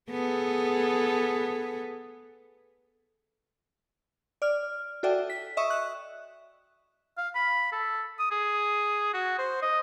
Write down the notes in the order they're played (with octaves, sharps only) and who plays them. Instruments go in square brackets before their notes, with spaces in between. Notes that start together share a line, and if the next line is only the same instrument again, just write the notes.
[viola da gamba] B3 G#4 A4
[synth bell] D5 F6
F#4 A4 D5 E5 G5
B6
D#5 E5 C#6 D#6
F#6
[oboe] F5
B5
A4
D#6
G#4
F#4
C5
D#5